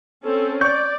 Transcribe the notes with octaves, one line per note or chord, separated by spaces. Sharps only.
C4 C#4 A4
D5 C#6 G6